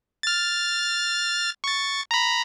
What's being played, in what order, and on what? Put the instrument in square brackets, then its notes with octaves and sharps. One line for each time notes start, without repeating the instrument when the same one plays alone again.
[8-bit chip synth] F6 A6
C#6 A6
A#5 B5